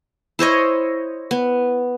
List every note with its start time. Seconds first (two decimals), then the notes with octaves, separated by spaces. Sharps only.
0.39 E4 C5 C#5 D#5
1.31 B3